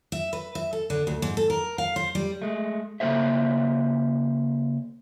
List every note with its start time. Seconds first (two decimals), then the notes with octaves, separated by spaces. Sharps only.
0.12 E5
0.33 B4
0.55 E5
0.73 A4
0.90 D3
1.07 D2
1.22 G#2
1.37 A4
1.50 A#4
1.78 F5
1.96 C5
2.15 G3
2.42 G#3 A3
3.00 C#3 A#3 B3 A4 C5 E5